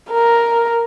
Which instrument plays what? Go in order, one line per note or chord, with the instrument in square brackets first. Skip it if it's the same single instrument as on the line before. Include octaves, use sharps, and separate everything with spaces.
[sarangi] A#4